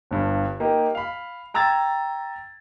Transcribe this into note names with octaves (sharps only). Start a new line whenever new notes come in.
G1 G2
A#3 D#4 G4
F5 B5
G5 A#5 E6 G#6 A6